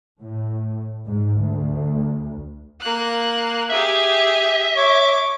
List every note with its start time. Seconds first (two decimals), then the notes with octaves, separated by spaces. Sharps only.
0.21 A2
1.05 G#2
1.41 D2
2.80 A#3 F#6
3.70 G4 G#4 E5
4.76 C#5 D6